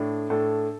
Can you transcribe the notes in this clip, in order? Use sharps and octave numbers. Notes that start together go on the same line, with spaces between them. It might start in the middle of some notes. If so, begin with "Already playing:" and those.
Already playing: A2 A3 D4
A2 A3 D4 A4